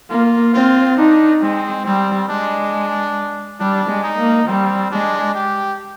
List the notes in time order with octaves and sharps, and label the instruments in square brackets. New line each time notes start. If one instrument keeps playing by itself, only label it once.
[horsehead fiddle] A#3 [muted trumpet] F4
[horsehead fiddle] C4 [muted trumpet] F4
[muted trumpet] D4 [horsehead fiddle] D#4
[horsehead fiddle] G#3 [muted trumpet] C4
[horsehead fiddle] G3 [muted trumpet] C4
[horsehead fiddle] G#3 [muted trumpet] D4
[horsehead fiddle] G3 [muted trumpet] D4
[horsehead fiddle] G#3
[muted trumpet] D#4
[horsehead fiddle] A#3
[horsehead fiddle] G3 [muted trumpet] C4
[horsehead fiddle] G#3 [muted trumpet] D4
[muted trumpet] G4